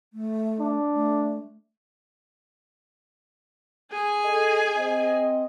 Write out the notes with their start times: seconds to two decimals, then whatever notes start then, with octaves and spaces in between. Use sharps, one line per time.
0.13 A3
0.60 D4
0.95 A3
3.91 G#4 G#5
4.25 A4 D#5
4.77 C4 D#5